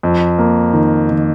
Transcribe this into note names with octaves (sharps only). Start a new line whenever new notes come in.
F2
A#3
D#3
D#3